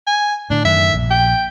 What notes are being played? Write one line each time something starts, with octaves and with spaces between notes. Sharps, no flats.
G#5
A2 D3 D4
F#2 D#3 A3 E5
A#1
G5